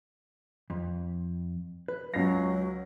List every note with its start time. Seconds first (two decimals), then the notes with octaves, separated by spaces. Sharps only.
0.70 F2
1.88 B4
2.14 C#2 F#3 F5 A#6